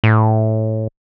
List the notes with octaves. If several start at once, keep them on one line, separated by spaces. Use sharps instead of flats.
A2